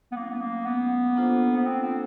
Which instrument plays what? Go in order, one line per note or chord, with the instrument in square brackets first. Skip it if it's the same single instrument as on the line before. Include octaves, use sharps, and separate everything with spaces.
[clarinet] B3
[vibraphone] F#3 A3 C#4 E4 [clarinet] A#3
[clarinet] B3
A#3
B3
[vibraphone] A#3 D4 F4 A4 C5
[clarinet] B3
C4
C4